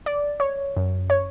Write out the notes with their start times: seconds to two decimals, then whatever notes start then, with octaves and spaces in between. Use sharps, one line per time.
0.06 D5
0.40 C#5
0.77 F#2
1.10 C#5